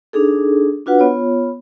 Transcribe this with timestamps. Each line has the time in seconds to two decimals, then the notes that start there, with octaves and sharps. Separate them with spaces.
0.13 D4 D#4 G#4 A4
0.86 D4 F4 F#4 B4 F#5
0.99 B3 F4 C#5